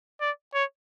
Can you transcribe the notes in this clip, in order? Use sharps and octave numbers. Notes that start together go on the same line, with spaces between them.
D5
C#5